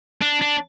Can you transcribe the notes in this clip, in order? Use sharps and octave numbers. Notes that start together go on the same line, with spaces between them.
D4
D4